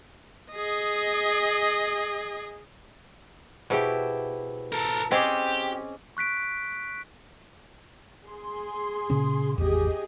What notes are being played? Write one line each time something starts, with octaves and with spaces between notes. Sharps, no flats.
G#4 D#5
B2 E4 G4 G#4 C5
A4 A#4
C4 C#4 G4 G#4 D#5 G#5 D6
C#6 F#6 B6 D7
G#4 C6
A#2 C#3 C#4
G#1 E2 G4 G#4 D#5